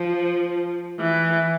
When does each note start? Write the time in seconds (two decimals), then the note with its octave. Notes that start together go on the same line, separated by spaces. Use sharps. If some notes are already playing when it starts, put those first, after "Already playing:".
Already playing: F3
1.00 E3